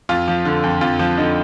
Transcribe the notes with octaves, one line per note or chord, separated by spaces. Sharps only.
F2 F4
F3
D3
F2
F2 F4
F3
D3 D#4